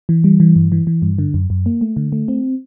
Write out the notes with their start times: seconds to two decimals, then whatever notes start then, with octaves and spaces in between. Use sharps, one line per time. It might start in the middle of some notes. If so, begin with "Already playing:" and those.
0.09 E3
0.24 G3
0.40 E3
0.56 G2
0.72 E3
0.87 E3
1.02 G2
1.19 D3
1.34 F#2
1.50 F#2
1.66 A#3
1.81 A3
1.97 D3
2.12 A3
2.28 C4